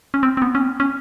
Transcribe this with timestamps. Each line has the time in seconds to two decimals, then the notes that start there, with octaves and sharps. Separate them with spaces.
0.14 C#4
0.23 C4
0.37 C4
0.42 B3
0.55 C#4
0.61 C4
0.80 C#4